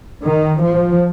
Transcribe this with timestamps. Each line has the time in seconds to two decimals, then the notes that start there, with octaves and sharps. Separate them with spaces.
0.22 D#3
0.60 F3